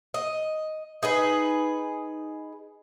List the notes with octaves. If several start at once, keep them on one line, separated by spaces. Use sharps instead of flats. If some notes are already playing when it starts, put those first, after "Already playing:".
D#5
D#4 G#4 B4